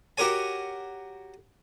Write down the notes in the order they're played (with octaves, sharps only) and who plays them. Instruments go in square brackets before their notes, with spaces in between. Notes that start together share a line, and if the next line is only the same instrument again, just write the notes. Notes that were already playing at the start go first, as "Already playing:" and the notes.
[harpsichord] F#4 G4 A#4 C#5 G#5